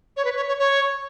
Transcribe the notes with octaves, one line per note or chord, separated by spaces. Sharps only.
C#5
B4
C#5
C#5
C#5